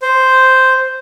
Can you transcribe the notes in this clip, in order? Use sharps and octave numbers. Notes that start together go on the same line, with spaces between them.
C5